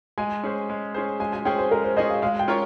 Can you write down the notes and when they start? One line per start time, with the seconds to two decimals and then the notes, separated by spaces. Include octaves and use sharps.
0.18 G#3 G#5
0.43 C#4 G#4 C5
0.69 G#3
0.94 C#4 G#4 C5
1.20 G#3 G#5
1.33 G#5
1.45 C#4 G#4 C5 G5
1.58 C5
1.71 G#3 A#4
1.84 C5
1.97 C#4 G#4 C5 D#5
2.10 F5
2.22 G#3 F5
2.39 G5
2.48 C#4 F4 A#4 C#5